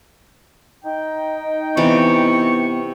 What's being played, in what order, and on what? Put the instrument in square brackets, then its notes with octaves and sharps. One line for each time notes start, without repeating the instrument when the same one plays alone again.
[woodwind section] D#4 G5
[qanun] C3 E3 D5 [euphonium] B3 [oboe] C#6